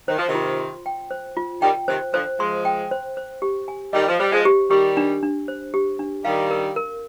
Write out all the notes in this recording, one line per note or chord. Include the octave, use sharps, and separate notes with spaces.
D#3 C5
F3
C3 D#3
F4
C6
G5
C5
F4
D#3 G3 G5
C3 D#3 C5
D3 F3 C5
F3 G#3 C6
G5
C5
C5
G4
G#5
D#3 G3 D#5
F3
G3 C5
F3 G#3
G4
D#3 G3 G4
D4
D4
C5
G4
D4
D#3 G3 F5
A#4
A#4